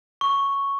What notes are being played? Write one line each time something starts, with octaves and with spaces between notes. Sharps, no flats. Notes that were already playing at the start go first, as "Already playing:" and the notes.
C#6